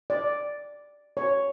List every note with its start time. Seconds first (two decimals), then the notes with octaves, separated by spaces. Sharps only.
0.10 D5
1.17 C#5